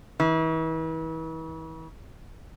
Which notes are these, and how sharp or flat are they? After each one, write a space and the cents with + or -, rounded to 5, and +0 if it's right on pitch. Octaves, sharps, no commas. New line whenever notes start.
E3 -40